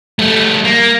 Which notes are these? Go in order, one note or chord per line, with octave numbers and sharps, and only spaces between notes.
G3 A3
A#3